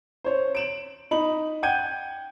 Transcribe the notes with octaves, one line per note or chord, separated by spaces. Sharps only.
C5 C#5
D7 E7 F#7
D#4 B5 F#7
F#5 G5 G6 G#6 D#7